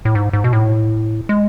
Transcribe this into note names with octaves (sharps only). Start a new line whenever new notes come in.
A2
G#2
G#2
B2
A2
G#3